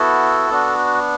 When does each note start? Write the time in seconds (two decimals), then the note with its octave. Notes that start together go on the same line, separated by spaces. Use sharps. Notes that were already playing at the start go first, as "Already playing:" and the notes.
Already playing: B3 E4 F#4 A4
0.50 B3 D4 F#4